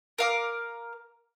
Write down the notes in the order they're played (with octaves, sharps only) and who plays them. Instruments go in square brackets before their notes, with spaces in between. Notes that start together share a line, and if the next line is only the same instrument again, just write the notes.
[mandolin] A#4 F5 D6